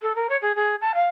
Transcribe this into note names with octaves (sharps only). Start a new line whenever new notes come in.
A4
A#4
C#5
G#4
G#4
A5
F5